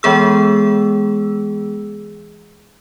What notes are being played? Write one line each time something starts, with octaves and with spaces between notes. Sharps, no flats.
E3 G#3 B3 G#4 E6